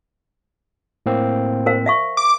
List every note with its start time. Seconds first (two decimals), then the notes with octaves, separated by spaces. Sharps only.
1.06 A2 A#3 C4
1.66 A#4 C5 F5
1.86 E5 F5 C#6
2.17 D6